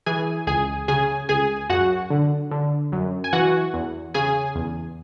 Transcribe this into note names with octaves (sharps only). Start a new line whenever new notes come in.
E3 G#4 G#5
C#2 G#4 G#5
C#3 G#4 G#5
C#2 G#4 G#5
F#2 F#4 F#5
D3
D3
F#2
G#5
E3 F#4 F#5
E2
C#3 G#4 G#5
E2